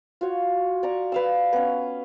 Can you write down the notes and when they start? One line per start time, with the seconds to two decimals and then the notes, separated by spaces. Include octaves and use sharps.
0.21 F4 F#4 C#5
0.83 D5 A#5 C#6
1.12 B4 F5 E6
1.53 B3 C#4